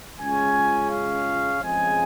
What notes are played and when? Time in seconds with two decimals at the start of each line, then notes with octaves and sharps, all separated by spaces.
0.19 C#2 C#3 G#3 C#4 F4 G#5
0.90 F5
1.61 F2 C#3 F3 G#3 G#5